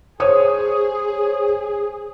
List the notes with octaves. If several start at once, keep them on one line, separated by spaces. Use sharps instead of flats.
G#4 C5 C#5 D#6